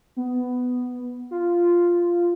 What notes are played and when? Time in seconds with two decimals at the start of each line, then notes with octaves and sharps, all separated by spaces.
0.16 B3
1.31 F4